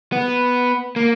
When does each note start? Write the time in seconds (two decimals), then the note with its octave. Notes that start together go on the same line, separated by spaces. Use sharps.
0.12 B3
0.96 A#3